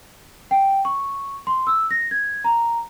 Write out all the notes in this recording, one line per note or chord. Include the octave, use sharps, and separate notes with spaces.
G5
C#6
C6
E6
A#6
G#6
A#5